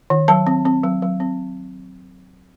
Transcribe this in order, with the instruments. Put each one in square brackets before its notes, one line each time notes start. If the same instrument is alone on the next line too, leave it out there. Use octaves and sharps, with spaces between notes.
[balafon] D#3
F#3 A5
C4
C4
F#3
F#3
C4